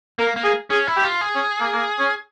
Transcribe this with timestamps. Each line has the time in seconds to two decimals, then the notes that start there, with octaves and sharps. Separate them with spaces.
0.18 A#3 A#4
0.36 A#3
0.44 G#4
0.70 C#4 G#4
0.87 E4
0.96 G4
1.04 F4
1.21 G#4
1.35 C#4
1.60 A#3
1.73 A#3
1.99 C#4